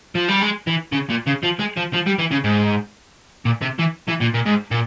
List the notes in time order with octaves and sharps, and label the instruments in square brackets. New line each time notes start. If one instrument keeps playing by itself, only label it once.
[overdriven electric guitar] F3
G3
G#3
E3
C#3
A#2
C#3
F3
G#3
F3
F3
G3
E3
C#3
G#2
A#2
C3
E3
E3
A#2
A#2
G#2
A#2